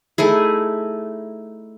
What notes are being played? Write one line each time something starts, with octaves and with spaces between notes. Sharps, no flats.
A3 D#4 E4 G#4